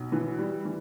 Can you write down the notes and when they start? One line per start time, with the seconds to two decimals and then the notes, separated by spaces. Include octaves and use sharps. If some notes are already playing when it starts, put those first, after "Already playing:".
Already playing: B1
0.12 E3
0.38 G3
0.65 E3